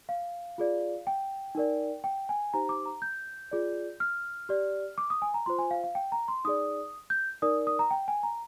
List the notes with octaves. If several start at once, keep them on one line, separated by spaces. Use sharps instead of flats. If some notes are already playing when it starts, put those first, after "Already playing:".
F5
F4 G#4 D5
G5
D#4 A#4 D5
G5
G#5
D#4 G4 C5 A#5
D6
A#5
G6
F4 G#4 D5
F6
G4 D5
D6
D#6
G#5
A#5
F4 C5 C6
G#5
F5
F5
G5
A#5
C6
D#4 G#4 D5 D#6
G6
D#4 A#4 D5 D#6
D#6
A#5
G5
G#5
A#5